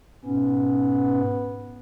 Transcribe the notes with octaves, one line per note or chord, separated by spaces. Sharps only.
G#2 B2 B3 C#4